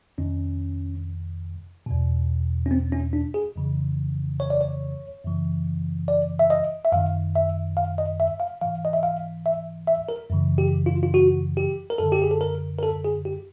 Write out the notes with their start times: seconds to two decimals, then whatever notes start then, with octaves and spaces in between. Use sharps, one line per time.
0.18 F2 C3 D#3 C#4
1.86 E2 B2
2.66 C#4
2.71 C4
2.92 C#4
3.13 D4
3.34 G#4
3.56 F2 C#3 E3
4.40 C#5
4.50 D5
4.61 C#5
5.24 F#2 C#3 E3
6.08 D5
6.39 E5
6.50 D#5
6.85 E5
6.92 F#2 D#3 F5
7.35 E5
7.77 F5
7.98 D#5
8.20 E5
8.40 F5
8.61 G#2 E3 F5
8.85 D#5
8.93 E5
9.03 F5
9.46 E5
9.87 E5
10.09 A#4
10.30 F#2 C#3 E3
10.58 G4
10.86 F4
11.03 F4
11.14 F#4
11.57 G4
11.90 A#4
11.98 F#2 D3 A4
12.12 G4
12.22 G#4
12.31 A4
12.41 A#4
12.79 A#4
12.83 A4
13.05 G#4
13.25 G4